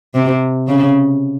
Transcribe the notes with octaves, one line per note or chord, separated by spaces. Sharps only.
C3
C#3